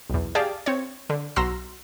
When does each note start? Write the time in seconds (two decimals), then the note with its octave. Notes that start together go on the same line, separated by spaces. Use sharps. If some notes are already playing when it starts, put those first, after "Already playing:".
0.10 B1 E2
0.35 G4 G#4 D5 F5 G5 A5
0.66 C4 C#5
1.10 D3
1.36 B1 F#4 A#5 C6 E6 A#6